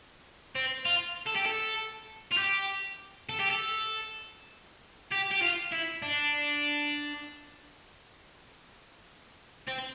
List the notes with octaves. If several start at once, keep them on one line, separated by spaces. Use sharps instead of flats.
C4
F4
A4
G4
A4
F4
G4
A4
G4
A4
G4
G4
F4
E4
D4
C4